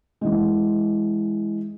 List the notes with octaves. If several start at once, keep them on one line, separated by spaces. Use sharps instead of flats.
E3 G#3